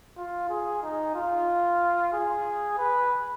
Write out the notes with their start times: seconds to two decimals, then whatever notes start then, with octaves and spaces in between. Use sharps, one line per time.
0.17 F4
0.50 G#4
0.82 D#4
1.15 F4
2.13 G#4
2.78 B4